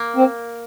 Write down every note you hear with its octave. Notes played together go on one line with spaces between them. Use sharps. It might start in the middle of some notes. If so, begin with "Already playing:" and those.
Already playing: A#3
C4